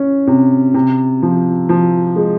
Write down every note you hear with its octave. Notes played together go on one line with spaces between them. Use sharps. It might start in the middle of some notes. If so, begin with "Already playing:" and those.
Already playing: C#4
C3
C3
F3
F3
G#3